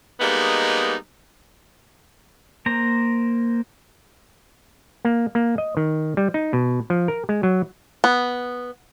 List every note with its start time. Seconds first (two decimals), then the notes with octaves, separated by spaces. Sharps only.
0.20 G3 G#3 A#3 B3 D#4
2.66 A#3 C5 A#5
5.05 A#3
5.35 A#3
5.58 D#5
5.77 D#3
6.17 G3
6.34 D#4
6.53 B2
6.90 F3
7.08 A#4
7.29 G#3
7.43 F#3
8.04 B3